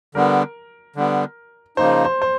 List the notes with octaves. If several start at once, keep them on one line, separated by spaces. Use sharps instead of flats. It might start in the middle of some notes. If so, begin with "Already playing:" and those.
D3 G3 B3 A#4
D3 G3 B3
C#3 F3 A#3 D#4 C5
C5
C5